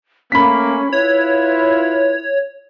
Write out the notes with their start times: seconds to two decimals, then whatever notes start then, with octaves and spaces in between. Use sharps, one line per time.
0.32 A3 A#3 C#4 B5 B6
0.93 E4 F4 B4 C#5